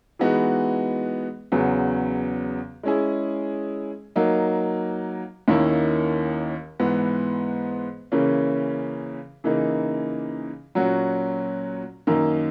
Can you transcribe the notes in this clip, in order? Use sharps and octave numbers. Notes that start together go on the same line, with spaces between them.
E3 G#3 B3 D#4 F#4
E2 C#3 F#3 B3
G#3 C#4 E4 G#4
F#3 A#3 D#4
D#2 D#3 A#3 C#4 E4
G#2 E3 B3
C#3 E3 A#3 C#4
C#3 E3 A#3 D#4
A#2 F#3 C#4 F#4
F#2 D#3 A#3